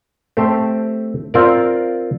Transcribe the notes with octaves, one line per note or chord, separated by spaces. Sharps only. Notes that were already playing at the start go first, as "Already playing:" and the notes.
A3 C4 G4 C5
C4 F4 A#4 D5